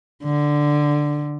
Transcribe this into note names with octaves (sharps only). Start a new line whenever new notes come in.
D3